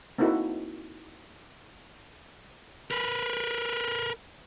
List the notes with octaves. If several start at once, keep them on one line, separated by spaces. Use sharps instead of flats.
A#3 C4 D#4 E4 F#4 A4
A#4 B4